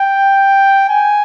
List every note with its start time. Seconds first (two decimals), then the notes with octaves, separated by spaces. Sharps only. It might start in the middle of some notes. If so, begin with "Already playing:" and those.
Already playing: G5
0.89 G#5